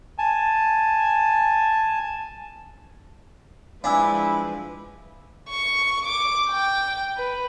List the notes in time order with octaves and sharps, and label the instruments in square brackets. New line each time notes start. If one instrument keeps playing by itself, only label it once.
[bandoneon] G#5 A5
[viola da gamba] F3 G#3 B4 [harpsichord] D4 [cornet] E4 [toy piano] F5 G#5 E6
[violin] C#6
D6
G5
B4